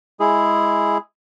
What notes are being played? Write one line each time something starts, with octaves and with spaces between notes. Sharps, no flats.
G#3 E4 G#4